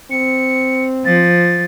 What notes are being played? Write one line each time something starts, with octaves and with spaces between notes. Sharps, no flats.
C4 C#7
F3 A6